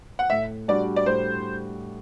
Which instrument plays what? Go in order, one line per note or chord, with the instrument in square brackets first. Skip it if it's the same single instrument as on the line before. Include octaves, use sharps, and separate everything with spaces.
[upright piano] F#5
[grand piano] A2 [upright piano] E5
[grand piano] G3 D4 F#4 [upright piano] D5
[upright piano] D5
[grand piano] A2 [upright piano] C5